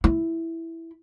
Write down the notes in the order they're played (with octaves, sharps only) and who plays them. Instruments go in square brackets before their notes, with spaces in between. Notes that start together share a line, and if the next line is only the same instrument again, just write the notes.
[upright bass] E4